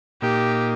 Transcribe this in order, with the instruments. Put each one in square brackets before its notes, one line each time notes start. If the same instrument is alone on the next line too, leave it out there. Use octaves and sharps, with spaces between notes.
[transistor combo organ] A#2 A#3 D#4 [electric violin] G4